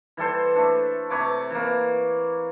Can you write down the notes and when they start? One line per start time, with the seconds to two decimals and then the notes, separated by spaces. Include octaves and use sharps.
0.17 E3 G3 A4 C5
0.55 A3 D4
1.10 C3 B4 C#5 D6
1.50 E3 A#3